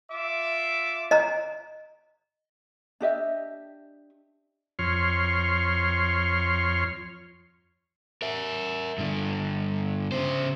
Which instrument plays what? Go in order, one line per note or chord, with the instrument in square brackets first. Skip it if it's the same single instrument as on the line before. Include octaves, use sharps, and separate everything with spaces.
[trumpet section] F4 E5 D6
[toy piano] D#5 A#5
[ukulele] D4 G4 D#5 E5
[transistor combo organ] F2 C#5 C6 F6
[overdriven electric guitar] A#4 E5
G2 D3
C#3 C5